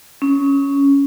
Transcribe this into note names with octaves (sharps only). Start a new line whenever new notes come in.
C#4